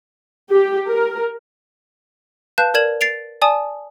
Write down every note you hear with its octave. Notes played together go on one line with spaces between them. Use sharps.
G4
A#4
B4 F5 A5 F#6 G6 E7
A#4 D5 G#6 E7 F#7
A6 C7 D7 F7
D5 G#5 A5 D#6